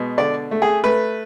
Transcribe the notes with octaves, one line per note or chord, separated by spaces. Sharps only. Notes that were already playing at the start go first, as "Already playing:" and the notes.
Already playing: B2 G#3
D3 D5
A3
G#4
A3 B4